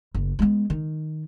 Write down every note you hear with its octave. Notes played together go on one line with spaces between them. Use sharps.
F#1
G#3 B3
D#3